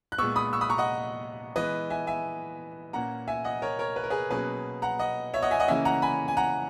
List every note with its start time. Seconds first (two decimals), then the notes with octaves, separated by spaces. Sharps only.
0.12 F#6
0.18 A#2 G#3 B3 C#6 E6
0.36 B5 D#6
0.53 C#6 E6
0.61 B5 D#6
0.70 A#5 C#6
0.78 D#5 F#5
1.55 E3 G#3 B3 B4 D#5
1.90 E5 G#5
2.07 E5 G#5
2.93 A#2 A#3 C#4 F#5 A#5
3.28 E5 G#5
3.44 D#5 F#5
3.62 A#4 C#5
3.79 A#4 C#5
3.96 B4
4.04 A#4
4.10 G#4 B4
4.30 B2 F#3 A#3 C#4 G#4 B4
4.82 F#5 A#5
4.99 D#5 F#5
5.34 C#5 E5
5.42 D#5 F#5
5.51 E5 G#5
5.60 D#5 F#5
5.68 C#3 E3 A#3 C#4 E5 G#5
5.85 F#5 A#5
6.02 G#5 B5
6.28 G#5
6.37 F#5 A#5